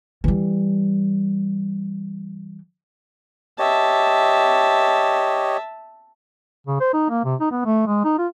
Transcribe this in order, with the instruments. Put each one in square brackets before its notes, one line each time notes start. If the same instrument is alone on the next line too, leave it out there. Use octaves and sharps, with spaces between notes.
[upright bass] E3 G3
[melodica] G4 C#5 D#5 [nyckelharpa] E5 A5
[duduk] C#3
C5
D#4
A#3
C3
D#4
B3
A3
G#3
D#4
F4